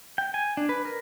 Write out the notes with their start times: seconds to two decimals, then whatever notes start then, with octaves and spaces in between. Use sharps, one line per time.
0.18 G5
0.34 G#5
0.57 D4
0.69 B4
0.85 A#4